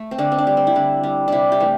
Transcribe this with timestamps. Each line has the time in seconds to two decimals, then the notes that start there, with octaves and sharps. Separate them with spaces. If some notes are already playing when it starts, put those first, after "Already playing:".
Already playing: A3
0.11 C4
0.18 D3 D4
0.32 C4
0.38 D4
0.47 G3
0.57 C4
0.67 E4
0.75 D3 D4
1.03 G3
1.28 C3 D4 E4
1.52 G4
1.60 E3 A3